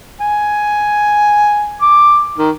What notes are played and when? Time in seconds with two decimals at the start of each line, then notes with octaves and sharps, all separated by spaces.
0.21 G#5
1.82 D6
2.38 D#3